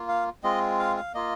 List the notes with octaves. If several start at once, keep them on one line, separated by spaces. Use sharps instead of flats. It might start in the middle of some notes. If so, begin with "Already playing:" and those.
Already playing: A#3 F4
F5
G#3 C4 F4 D#5
F5
F5
A#3 F4 D#5